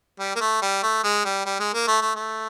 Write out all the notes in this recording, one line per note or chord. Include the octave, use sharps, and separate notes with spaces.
G3
A#3
A3
G3
A3
G#3
G3
G3
G#3
A#3
A3
A3
A3